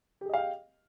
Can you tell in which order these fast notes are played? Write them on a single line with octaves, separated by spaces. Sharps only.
G4 G#4 D#5 F5 G5